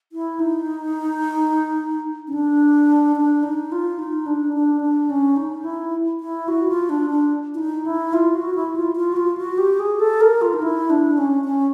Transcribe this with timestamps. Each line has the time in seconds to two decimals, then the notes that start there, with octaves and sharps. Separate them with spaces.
0.12 E4
0.39 D#4
2.27 C#4
2.33 D4
3.16 D4
3.43 D#4
3.72 F4
3.99 D#4
4.26 D4
4.54 D4
4.81 D4
5.10 C#4
5.36 D#4
5.64 E4
6.20 E4
6.48 F#4
6.68 F4
6.89 D4
7.10 D4
7.54 E4
7.58 D#4
7.85 E4
8.13 F4
8.34 F#4
8.55 E4
8.75 F4
8.96 F4
9.12 F#4
9.16 F4
9.37 F#4
9.58 G4
9.79 G#4
9.99 A4
10.21 A#4
10.41 F4
10.53 D#4
10.62 E4
10.90 D4
11.18 C#4
11.44 C#4